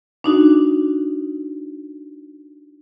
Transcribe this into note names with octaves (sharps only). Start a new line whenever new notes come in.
D4 D#4 F#4